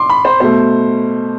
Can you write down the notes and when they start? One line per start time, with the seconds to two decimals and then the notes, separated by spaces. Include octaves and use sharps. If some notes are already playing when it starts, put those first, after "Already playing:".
Already playing: C6 D6
0.09 B5
0.25 C5
0.40 B2 A3 C5